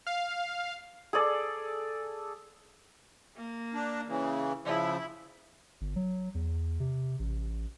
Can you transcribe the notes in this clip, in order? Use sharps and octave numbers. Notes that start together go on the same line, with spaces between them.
F5
G#4 A4 D5
A#3
D4
C#3 E3
C#3 F3 E4
G1
F#3
E2
C3
A1